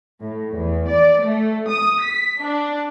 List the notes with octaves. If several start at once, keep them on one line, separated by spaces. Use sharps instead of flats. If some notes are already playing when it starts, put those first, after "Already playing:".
A2
E2
D5
A3
D#6
B6
D4